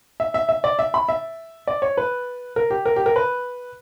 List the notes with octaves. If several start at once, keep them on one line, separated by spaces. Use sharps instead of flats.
E5
E5
E5
D5
E5
B5
E5
D5
C#5
B4
A#4
G4
A#4
G4
A#4
B4